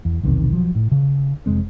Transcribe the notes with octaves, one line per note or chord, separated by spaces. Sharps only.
E2
B1 E2 C3 D#3
F3 F#3
A2
C#3
F1 G#3 C4